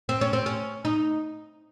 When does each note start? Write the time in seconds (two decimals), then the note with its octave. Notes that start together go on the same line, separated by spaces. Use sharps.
0.09 C4
0.21 C#4
0.33 C4
0.46 C#4
0.85 D#4